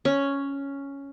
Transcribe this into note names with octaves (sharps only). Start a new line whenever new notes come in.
C#4